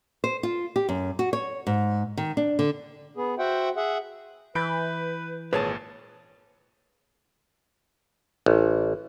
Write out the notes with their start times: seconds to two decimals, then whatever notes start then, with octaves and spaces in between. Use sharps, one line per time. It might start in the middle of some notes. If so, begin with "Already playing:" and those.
0.24 C5
0.43 F4
0.76 G4
0.89 F#2
1.19 F#4
1.33 C#5
1.67 G#2
2.17 D#3
2.37 D4
2.59 D3
3.17 B3 G#4
3.39 F#4 C5 E5 F#5 G5
3.76 G#4 E5 F#5
4.55 E3 B4 B5 G6 D7
5.53 G#1 A#2 G#4 B4 C#5 A5
8.46 A1